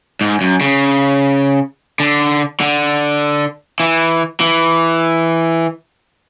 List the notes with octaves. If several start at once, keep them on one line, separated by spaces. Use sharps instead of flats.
G#2
F#2
C#3
D3
D3
E3
E3